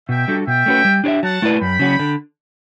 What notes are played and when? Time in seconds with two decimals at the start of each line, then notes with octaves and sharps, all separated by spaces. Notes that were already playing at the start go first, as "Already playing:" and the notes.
0.09 B2 E5 G5
0.28 G3 D4 F#4 A4
0.47 B2 E5 G5
0.66 A3 C#4 F#4 B4
0.85 G3
1.04 D4 G4 C#5 E5
1.23 F#3 F#5 A5
1.42 A3 E4 B4 D5
1.60 F#2 G5 B5
1.80 C#3 F#3 C#4 F#4
1.99 D3